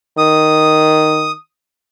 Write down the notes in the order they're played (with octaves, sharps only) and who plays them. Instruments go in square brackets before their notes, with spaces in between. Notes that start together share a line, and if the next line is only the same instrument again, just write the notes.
[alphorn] D#3 [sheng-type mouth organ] D#6